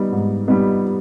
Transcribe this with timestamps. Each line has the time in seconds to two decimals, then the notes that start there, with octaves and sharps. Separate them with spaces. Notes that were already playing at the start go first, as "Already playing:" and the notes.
Already playing: G3 B3 D#4
0.12 G#2
0.48 G3 B3 D#4